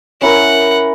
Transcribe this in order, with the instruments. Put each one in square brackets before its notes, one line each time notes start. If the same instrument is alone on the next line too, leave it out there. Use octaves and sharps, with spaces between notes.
[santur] C#4 E4 A#4 [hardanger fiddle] F#5